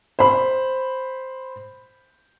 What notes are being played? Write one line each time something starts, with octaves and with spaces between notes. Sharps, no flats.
C5 B5